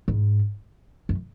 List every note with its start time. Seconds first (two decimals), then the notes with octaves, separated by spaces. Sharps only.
0.08 G#2
1.09 F#2